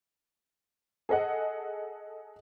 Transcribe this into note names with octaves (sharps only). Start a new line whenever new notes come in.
G#4 A4 D#5 F#5